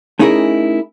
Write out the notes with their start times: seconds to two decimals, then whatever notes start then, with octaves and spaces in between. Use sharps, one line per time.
0.19 A3 C#4 D#4 E4 G#4 A#4